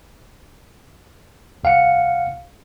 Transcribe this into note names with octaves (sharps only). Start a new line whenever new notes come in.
C2 F5 F#5 C#7